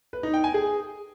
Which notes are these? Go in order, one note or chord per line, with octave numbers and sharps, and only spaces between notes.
B4
D#4
G5
G#5
G#4